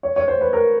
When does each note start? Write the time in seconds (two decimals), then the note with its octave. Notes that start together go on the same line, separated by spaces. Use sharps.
0.03 C#5
0.16 C#5
0.28 C5
0.41 B4
0.53 A#4